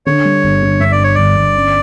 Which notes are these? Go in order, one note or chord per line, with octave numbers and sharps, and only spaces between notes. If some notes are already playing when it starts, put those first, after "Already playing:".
D3 C#5
G3
G1
D3
G2 E5
D5
G2 C#5
G1 D5
G1
C#4